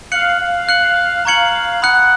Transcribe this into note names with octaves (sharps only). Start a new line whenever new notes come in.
F5 F#6 C#7 F#7
F5
F#6 C#7 F#7
F5 A#5 C#6 G#6 C#7 F#7
F#5 B5 D#6 F#6 C#7